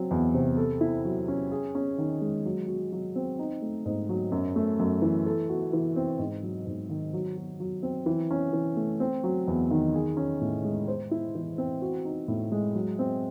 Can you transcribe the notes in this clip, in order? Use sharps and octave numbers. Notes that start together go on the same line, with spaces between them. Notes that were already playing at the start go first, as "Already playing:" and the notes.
Already playing: F#3 C4
E2
C3
A4
E4
F#3
C#4
G#4
C#4
D#3
G#3
F#3
F#4
F#3
C4
D#4
A3
G#2
F#3
F#2
A3
F#2
E3
A4
F#4
E3
C4
G#2
F#3
G#2
D#3
F#3
F#4
F#3
C4
E3
C#4
E3
A3
C4
F#3
E2
D#3
G#4
C#4
A2
G#3
C5
E4
E3
C4
F#4
D#4
A2
G#3
F#3
C4